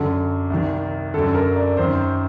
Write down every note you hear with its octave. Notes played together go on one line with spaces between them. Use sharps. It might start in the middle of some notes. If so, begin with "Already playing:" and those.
Already playing: F#2 D3
C2 C3 D#3
F#2 D3 A4
A#4
D5
F#2 D#3 C5